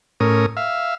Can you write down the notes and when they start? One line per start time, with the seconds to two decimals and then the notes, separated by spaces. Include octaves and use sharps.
0.20 A2 C#4 A#4 D#6
0.57 E5 F5